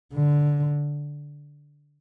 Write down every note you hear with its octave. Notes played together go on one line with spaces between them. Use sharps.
D3